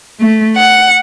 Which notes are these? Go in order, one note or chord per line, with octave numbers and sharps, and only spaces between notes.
A3
F#5